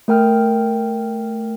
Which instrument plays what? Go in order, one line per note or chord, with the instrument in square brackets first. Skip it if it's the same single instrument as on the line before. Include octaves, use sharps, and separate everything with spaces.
[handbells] A3 A#4 G5 F6